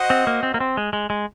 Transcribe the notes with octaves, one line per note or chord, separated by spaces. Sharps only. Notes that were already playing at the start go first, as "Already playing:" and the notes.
Already playing: F#4 C5 D#5 F#5
C4
A#3
C4
A#3
C4
G#3
G#3
G#3